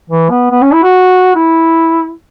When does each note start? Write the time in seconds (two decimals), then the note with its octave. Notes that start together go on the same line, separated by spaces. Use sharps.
0.10 E3
0.30 B3
0.51 B3
0.62 C#4
0.72 E4
0.83 F#4
1.35 E4